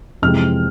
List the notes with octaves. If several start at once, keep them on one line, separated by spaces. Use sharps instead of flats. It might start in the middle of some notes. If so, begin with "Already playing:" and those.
F2 C3 E3 G#3 C4 F6